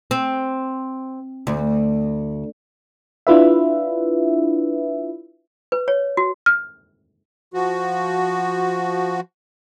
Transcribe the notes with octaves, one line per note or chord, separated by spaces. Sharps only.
C4
D2
D4 E4 F4 B4 E5
B4
C#5
F#4
F6
F3 F#4